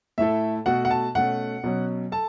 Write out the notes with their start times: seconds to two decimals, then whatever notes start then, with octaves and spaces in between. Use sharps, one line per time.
0.18 A2 A3 E4 A4 E5
0.66 B2 A3 F#4 A4 F#5
0.85 F#5
0.91 A5
1.15 B2 A3 C#4 F#5
1.64 B2 F#3 C#4
2.12 A4 A5